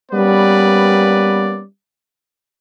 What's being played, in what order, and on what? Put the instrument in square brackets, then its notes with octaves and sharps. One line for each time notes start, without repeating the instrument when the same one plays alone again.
[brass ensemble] G3 A#3 B3 C#4 B4 D5